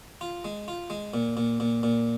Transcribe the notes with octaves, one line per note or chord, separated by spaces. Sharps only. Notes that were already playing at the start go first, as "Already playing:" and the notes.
F4
G#3
F4
G#3
A#2
A#2
A#2
A#2